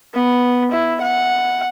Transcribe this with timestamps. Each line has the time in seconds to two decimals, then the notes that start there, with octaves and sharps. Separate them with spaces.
0.14 B3
0.72 E4
1.02 F#5